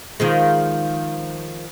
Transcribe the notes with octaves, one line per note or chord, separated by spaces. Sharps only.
D#3 F3 G#3